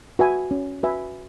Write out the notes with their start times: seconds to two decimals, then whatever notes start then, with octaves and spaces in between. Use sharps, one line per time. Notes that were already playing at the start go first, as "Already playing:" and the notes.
0.19 F#4 B4 E5 G#5
0.51 C#4
0.83 F#4 B4 E5 G#5